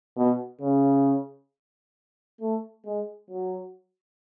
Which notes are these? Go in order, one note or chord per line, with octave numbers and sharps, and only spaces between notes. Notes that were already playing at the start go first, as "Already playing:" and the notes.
B2
C#3
A3
G#3
F#3